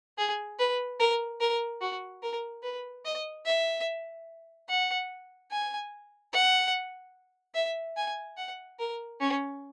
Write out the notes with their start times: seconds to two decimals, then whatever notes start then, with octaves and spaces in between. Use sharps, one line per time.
0.18 G#4
0.59 B4
1.00 A#4
1.41 A#4
1.81 F#4
2.23 A#4
2.63 B4
3.05 D#5
3.45 E5
4.69 F#5
5.51 G#5
6.33 F#5
7.55 E5
7.97 G#5
8.37 F#5
8.79 A#4
9.20 C#4